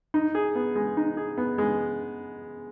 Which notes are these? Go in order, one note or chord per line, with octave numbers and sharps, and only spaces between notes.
D#4
G#4
B3
G#3
D#4
G#4
B3
G#3